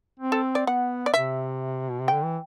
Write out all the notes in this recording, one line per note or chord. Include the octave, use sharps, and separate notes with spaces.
C4
A4
D5
B3 F#5
D5
C3 E5
B2
C3
D3 G5
E3